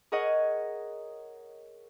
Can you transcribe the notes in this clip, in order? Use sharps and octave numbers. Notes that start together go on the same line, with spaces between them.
G#4 A#4 C#5 D#5 F#5